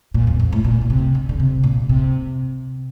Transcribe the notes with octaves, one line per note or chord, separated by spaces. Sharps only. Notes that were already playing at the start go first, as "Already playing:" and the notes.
A#2
F2
F2
A2
A#2
A#2
C3
D3
D3
C3
A#2
C3